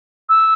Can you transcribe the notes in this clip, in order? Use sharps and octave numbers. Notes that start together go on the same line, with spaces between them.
E6